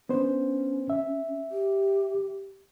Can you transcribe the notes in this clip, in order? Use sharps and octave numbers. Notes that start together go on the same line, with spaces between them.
B3 C#4 D4 C5
E5
G4